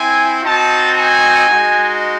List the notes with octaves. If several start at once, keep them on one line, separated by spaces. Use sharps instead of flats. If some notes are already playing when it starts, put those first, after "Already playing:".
Already playing: C4 E4 G#5
C4 D#4 F#4 A5
G#5
G#3 D#4 F#4